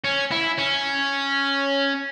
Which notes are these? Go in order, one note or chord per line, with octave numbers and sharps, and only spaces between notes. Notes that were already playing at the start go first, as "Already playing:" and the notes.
C#4
E4
C#4